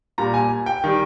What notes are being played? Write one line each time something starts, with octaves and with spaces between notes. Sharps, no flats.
A#2 G3 A#5
G#5
G5
D#3 G3